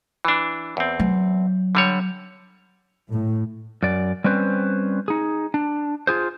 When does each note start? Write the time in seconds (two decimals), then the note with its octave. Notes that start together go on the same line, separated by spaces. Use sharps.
0.25 E3 D4
0.77 E2 C4
1.00 F#3
1.75 D3 G3 C#5
3.10 A2
3.83 F#2 D5
4.24 G3 C4 C#4 B4 C5
5.08 D#4 G#4
5.54 D4
6.07 F4 G#4 C5